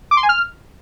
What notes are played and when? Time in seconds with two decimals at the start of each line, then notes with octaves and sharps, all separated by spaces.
0.11 D6
0.17 C6
0.23 G#5
0.29 F6